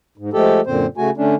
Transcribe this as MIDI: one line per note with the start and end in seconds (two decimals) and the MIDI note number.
0.18 0.30 44
0.33 0.61 53
0.33 0.61 56
0.33 0.61 57
0.33 0.61 67
0.33 0.61 69
0.67 0.86 42
0.67 0.86 46
0.67 0.86 50
0.67 0.86 60
0.67 0.86 72
0.97 1.10 49
0.97 1.10 57
0.97 1.10 66
0.97 1.10 80
1.17 1.35 50
1.17 1.35 57
1.17 1.35 61
1.17 1.35 62